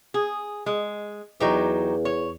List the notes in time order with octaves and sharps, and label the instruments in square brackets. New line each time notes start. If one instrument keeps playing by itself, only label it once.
[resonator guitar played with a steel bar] G#4
G#3
[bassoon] E2 [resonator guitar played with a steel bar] F#3 D#4 G4
[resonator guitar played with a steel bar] C#5